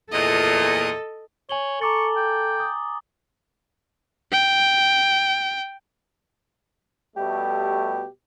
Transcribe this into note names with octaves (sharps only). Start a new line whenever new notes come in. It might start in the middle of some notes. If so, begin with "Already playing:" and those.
E2 A#2 A4 D#5
C#5 G#5 F#7 G7
A4 A#5 C#6 D6 A6
G5
D#6
G5
B2 G3 A3 G4